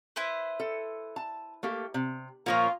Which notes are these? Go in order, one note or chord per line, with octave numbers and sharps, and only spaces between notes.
E4 B4 C5
A4
A5
A3 A#3 G4
C3
A#2 F3 A#3 C#4 F4 A#4 C#5